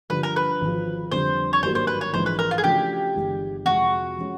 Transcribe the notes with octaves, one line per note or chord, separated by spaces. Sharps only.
G2 D3 F3 B4
A#4
B4
G#1 G#2 F3
F2 D3 G3 C5
C#5
G#1 G2 D#3 F#3 A#3 C5
C5
B4
C#5
A#1 G#2 E3 G#3 C5
B4
A#4
F4
G#4
C#3 F3 A3 D4 F#4 G4
G1 G2 E3 G#3
F2 C3 F3 G#3 F#4
F3 G#3 C#4